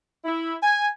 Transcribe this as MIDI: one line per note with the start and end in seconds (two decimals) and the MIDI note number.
0.24 0.56 64
0.61 0.87 80